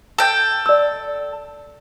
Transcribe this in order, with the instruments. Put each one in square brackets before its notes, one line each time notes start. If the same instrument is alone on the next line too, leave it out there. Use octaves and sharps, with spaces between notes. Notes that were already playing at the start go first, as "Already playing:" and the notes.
[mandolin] A4 G5
[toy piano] D5 E6